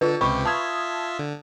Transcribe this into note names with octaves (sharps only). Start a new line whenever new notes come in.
D3 F4 A4 B4
C#2 C3 G4 B4 B5 C#6
F4 E5 A5 D#6 G#6
D3